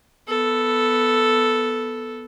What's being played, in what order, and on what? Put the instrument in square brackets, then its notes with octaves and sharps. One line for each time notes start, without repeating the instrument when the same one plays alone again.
[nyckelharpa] B3 A4